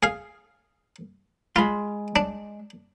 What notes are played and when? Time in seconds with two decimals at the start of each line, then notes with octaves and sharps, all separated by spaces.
0.03 G#4 F5
1.56 G#3 F4 B5 C6
2.16 D4